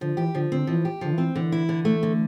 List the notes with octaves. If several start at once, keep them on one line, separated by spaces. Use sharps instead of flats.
D3 F3
E3 G4
D3 F3
D3 C4
E3 F3
G4
D3 F3
E3 C4
D3 E3
E4
D3
A3
D3